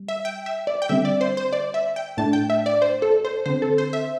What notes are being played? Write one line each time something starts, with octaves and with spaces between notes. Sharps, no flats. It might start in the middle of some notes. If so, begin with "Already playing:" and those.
Already playing: G3
E5
G5
E5
D5
G5
D3 G3 C4 E5
D5
C5
C5
D5
E5
G5
A2 A3 D4 A5
G5
E5
D5
C5
A4
C5
D3 C4 C5
A4
C5
E5